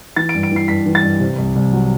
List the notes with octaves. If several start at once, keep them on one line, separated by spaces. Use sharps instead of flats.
E3 A6
D7
G2
D7
E3 C7
G2 B6
E3
A6
G2
C3
C2
C2
F#3